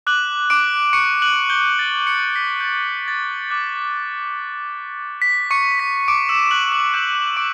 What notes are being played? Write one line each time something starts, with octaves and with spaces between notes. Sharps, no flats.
D6 F#6 F#7
D6 D7
C#6 C#7
F#6 F#7
G6 G7
A6
C#6 C#7
B6
G6
A6
A6
D6 F#6
B6
C#6 C#7
B6
D6 D7
E6 E7
F#6 F#7
E6 E7
C#6 E6 G6 E7
D6 D7